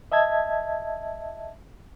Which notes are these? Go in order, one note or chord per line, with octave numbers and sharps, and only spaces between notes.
D#5 E5 A5 G#6